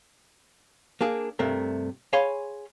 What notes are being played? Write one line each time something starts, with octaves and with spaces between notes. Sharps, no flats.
A#3 D4 G#4
G2 C3 A3 A#4
G#4 C#5 F5 G#5 B5 C6